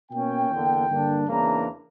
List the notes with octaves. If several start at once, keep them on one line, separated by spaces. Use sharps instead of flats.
B2 A#3 C#4 G5
E2 D3 A#3
G2 D3 A#3 D4
E2 C#3 E3 A#3 D4 A#5